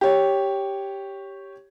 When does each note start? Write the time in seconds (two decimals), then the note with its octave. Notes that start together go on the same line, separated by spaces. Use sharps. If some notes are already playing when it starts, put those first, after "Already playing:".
0.01 G4 C#5